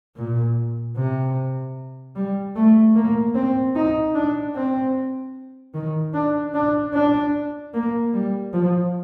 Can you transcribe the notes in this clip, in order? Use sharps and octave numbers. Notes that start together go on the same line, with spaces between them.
A#2
C3
G3
A3
A#3
C4
D#4
D4
C4
D#3
D4
D4
D4
A#3
G3
F3